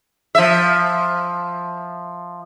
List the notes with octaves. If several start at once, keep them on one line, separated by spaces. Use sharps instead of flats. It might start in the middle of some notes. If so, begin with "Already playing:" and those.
F3 E5